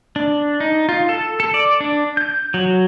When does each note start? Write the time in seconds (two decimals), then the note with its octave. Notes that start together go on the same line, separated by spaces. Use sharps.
0.16 D4
0.60 D#4
0.89 F4
1.09 A4
1.40 A4
1.54 D5
1.80 D4
2.17 G6
2.54 F#3